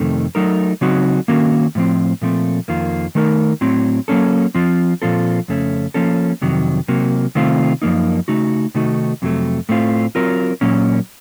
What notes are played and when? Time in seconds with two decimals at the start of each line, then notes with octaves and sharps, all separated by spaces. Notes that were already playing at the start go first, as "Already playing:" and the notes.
Already playing: F2 C3 D#3 A3
0.35 F#3 A3 D#4 A#4
0.81 C#3 F#3 C4 D#4 F#4
1.28 D#3 A#3 C#4 F#4
1.75 A2 F3 C4
2.21 A#2 F3 A3 C4
2.68 F2 D#3 A#3 F4
3.15 D#3 A3 D#4 A#4
3.61 A2 F#3 C4
4.08 F#3 A#3 C#4 A4
4.55 F3 C4 F4
5.02 A#2 F3 C4 F4 A4
5.48 F2 C#3 A3 C#4
5.94 F3 A#3 C#4 A4
6.42 F2 C3 D#3 F#3
6.88 C3 F#3 A#3
7.35 C3 D#3 A3 C4 F4
7.82 F#2 F3 A#3 D#4
8.28 C#3 A3 D#4 F#4
8.74 C3 D#3 A3 D#4 F#4
9.22 F2 C3 F#3 A3
9.69 A2 A3 C4 F4
10.15 F#3 C4 F4 A#4
10.61 A#2 F#3 A#3 C#4